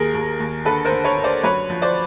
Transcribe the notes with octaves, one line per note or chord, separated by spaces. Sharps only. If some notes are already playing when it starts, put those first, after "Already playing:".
Already playing: D#2 G#4 A#4
D#2
D#2
D3 A4 B4
A#4 C5
D3
B4 C#5
D3
C5 D5
F#2 B4 C#5
F3
C5 D5